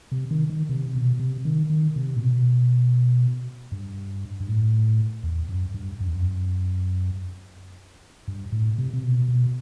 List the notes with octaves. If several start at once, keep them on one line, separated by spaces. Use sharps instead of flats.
C3
D#3
D#3
C3
B2
C3
D#3
D#3
C3
A2
B2
G2
G2
A2
E2
F#2
G2
F#2
E2
F#2
G2
A2
C3
C3
B2
B2